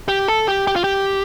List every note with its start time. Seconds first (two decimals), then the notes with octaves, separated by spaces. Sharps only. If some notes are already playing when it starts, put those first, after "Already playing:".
0.08 G4
0.28 A4
0.48 G4
0.67 G4
0.76 F4
0.84 G4